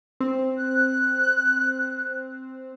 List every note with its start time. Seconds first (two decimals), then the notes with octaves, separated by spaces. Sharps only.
0.20 C4
0.58 F#6